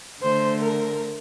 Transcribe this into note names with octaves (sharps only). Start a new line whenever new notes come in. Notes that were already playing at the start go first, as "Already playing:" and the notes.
D3 A3 C5
A#4